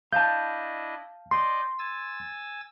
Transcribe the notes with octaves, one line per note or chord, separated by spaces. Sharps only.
D4 E4 D#5 F5 A5 G6
D5 D#5 G5 C6
G#5 E6 A6